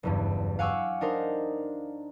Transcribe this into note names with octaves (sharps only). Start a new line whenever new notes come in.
F#1 E2 G2
F5 F#5 G#5 C#6 D6 E6
D4 D#4 A#4 C5